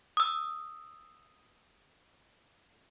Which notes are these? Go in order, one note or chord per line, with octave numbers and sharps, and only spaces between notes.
D#6 E6